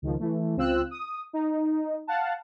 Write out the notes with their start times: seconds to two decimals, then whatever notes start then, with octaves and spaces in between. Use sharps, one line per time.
0.02 C#2 D#3 F3
0.20 E3 A3
0.56 C#2 C4 F4 E6 F#6
0.91 D#6
1.33 D#4
2.07 F5 F#5 A5